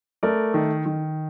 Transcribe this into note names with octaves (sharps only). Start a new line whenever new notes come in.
A3 A#4 D5
D#3
D#3